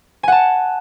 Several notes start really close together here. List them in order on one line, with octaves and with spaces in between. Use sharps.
G#5 F#5 A5